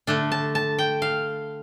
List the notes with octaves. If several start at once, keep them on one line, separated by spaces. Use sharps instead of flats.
D3 A3 D4
A5
A5
G5
F5